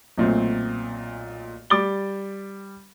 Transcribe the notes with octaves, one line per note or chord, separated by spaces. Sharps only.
B1 A#2 A3 C4
G3 D6 A6 G7